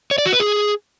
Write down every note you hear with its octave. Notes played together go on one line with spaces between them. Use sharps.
C#5
D5
F#4
B4
G#4